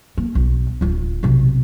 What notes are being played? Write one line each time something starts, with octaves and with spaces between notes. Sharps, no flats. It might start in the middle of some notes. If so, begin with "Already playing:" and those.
A#3
B1
D1 F4
B1 C3